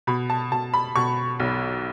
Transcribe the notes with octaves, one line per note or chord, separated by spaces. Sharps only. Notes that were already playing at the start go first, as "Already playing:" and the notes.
B2 B5
A5
B2 A5
B5
B2 C#6
B1